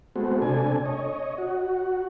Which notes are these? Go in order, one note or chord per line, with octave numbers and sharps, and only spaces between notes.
G#3 A3 B3 C4 F#4
C3 D4 A4 G#5
C#5 D#5
F#4